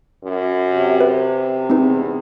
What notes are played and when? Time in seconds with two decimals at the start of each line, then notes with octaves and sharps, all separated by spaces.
0.24 F#2
0.69 C3
1.00 B4
1.70 E2 C4 D#4 B4